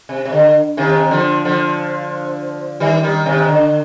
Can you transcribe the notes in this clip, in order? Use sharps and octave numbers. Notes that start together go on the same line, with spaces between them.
C3
C3
D3
C3 D#3
D3 F3
D3 F3
D#3 G3
D#3 G3
C3 D#3
D3